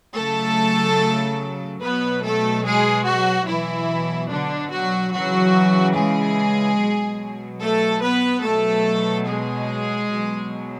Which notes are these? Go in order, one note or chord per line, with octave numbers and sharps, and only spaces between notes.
C#3 F#3 A3 A4
B2 F#3 B3 B4
A3 A4
G#3 G#4
F#3 F#4
B2 E3 F#3 E4
D3 D4
F#3 F#4
C#3 E3 F#3 F#4
G#3 G#4
B2 F#3
A3 A4
B3 B4
B2 F#3 A3 A4
G#3 G#4
B2 F#3